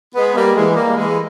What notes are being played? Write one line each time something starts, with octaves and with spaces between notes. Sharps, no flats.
G#3 B3
G3 A#3
E3 G#3
G3 A#3
E3 G#3